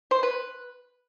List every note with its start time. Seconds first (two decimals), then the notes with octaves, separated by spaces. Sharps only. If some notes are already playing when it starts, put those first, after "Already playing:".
0.11 C5
0.23 B4